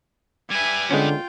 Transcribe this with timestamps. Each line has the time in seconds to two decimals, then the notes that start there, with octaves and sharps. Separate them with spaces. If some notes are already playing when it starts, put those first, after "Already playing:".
0.51 G3 B4 E5 G#5
0.91 D3 G#3 B3 C#4 F4 G5